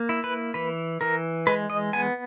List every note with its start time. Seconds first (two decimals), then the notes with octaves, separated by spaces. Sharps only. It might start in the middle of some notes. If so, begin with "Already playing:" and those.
Already playing: A#3
0.09 E4
0.24 B4
0.54 E3 B4
1.01 E3 A#4
1.47 G#3 B4
1.70 D#5
1.93 B3 G#5